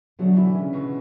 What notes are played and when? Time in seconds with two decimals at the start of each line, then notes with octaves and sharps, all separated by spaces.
0.19 B2 D3 F#3 A3 D4
0.36 E3 E4
0.55 C#3 C#4
0.73 B2 B3